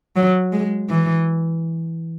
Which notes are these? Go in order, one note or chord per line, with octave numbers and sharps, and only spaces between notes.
F#3
G#3
E3